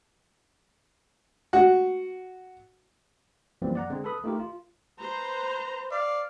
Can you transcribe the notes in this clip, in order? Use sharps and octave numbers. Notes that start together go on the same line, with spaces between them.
F#4
F#2 E3 F3 G3 A#3 C4
D5 F#5 A#5
D3 G#3 C4
A4 B4 B5 D#6
A3 D#4 F4 G4 A#4
F4
B4 C5 A#5
D5 F5